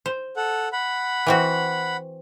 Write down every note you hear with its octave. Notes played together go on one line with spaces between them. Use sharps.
C5
A4 F#5
F#5 B5
E3 C4 F#4